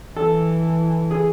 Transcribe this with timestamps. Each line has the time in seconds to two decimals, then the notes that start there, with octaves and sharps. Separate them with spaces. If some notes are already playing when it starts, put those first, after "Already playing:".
0.16 E3 A4
1.11 G#4